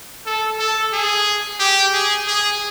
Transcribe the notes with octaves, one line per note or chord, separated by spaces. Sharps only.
A4
A4
G#4
G4
G#4
G#4